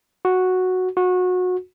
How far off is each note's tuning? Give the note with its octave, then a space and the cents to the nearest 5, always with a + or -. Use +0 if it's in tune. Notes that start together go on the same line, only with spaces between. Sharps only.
F#4 -5
F#4 -25